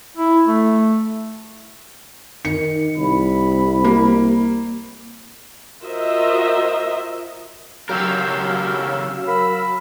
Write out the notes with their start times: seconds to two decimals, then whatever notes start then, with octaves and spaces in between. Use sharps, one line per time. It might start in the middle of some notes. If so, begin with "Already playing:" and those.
0.17 E4
0.47 A3
2.45 D#3 C#7
2.98 C2 B5
3.85 A#3
5.82 F4 F#4 A#4 C5 D#5 E5
7.89 C#3 F#3 G4 A#4 F5 E6
9.27 A#4 B5